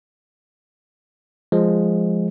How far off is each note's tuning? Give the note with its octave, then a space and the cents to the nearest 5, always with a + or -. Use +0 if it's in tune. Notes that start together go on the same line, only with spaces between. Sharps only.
F3 +0 G#3 -5